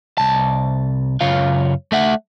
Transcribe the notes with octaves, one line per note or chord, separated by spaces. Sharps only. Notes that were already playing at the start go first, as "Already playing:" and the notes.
C2 A5
F#2 C#3 F4 C#5 F5
A3 E5 F#5